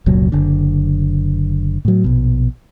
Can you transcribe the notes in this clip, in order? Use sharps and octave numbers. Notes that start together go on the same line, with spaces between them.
F1 C#2 A#2 F#3
F#1 D3
A2 F#3
A#1 B2